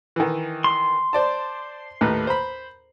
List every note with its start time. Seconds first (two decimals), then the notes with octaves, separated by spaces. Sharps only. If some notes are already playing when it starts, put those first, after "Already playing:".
0.16 D#3 E3
0.64 C6
1.13 C5 D5 A5
2.01 D#2 A2 B4
2.27 C5 B5